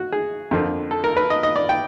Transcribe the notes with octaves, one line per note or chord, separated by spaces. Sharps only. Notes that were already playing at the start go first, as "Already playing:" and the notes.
Already playing: F#4
G#4
F2 D3 F3 A#3
A4
A#4
B4
D#5
D#5
D5
G5